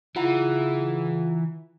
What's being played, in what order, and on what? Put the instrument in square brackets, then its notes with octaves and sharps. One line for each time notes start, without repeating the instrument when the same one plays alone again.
[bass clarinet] C#3 [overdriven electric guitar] E3 [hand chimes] F4 F#5 A#5